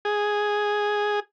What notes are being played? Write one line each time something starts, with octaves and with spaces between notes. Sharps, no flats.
G#4